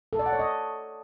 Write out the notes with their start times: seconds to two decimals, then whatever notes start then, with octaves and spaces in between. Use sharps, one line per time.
0.13 A4
0.19 D5
0.26 F#5
0.33 C#5
0.39 D#5